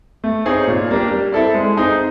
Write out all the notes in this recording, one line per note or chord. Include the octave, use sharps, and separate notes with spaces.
A3
C4 D#4 G#4 C#5
A#2
G3 A#3 D4 G4
G3
C4 E4 A4 D5
G#3
C4 D#4 G#4